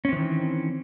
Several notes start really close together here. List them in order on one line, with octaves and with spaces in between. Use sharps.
C#4 C4 E3 D#3